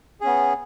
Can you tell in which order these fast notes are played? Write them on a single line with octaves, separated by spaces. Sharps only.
G#4 C#4 B3